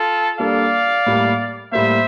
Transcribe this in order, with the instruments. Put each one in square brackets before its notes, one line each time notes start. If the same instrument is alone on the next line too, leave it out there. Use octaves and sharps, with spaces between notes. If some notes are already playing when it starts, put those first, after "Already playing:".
Already playing: [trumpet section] F4 A4
[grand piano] G3 A#3 D4 A4 [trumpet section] D5 F5
[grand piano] A2 G3 A#3
[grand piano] A2 G3 A#3 [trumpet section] C5 E5